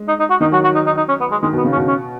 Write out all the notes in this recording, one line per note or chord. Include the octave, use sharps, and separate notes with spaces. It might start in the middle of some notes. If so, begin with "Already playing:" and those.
Already playing: G#3
D#4
D#4
F#4
D#3 D#4
F#3 F#4
F#4
D#4
D#4
D#4
C#4
B3
G#3
D#3 G#3
B2 B3
C#3
C#4
B2
C#4